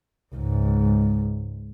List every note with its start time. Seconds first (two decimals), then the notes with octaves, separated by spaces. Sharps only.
0.35 C#2 G#2